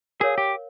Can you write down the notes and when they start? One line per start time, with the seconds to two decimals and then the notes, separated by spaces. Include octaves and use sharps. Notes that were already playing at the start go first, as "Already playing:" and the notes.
0.20 G#4 A#4 C#5 F5
0.38 G4